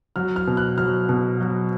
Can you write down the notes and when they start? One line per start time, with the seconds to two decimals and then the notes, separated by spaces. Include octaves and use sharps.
0.16 F#3 F6
0.36 F6
0.47 B2
0.57 F#6
0.78 F#3 F6
1.09 B2
1.41 F#3